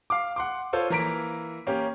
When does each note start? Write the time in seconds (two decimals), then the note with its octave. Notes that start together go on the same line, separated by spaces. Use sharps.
0.10 F5 D6
0.36 F#5 C6 D6
0.73 F4 A4 C5 C#5
0.90 E3 A#3 A#4 A#5 B6 D7
1.67 A#3 C#4 G4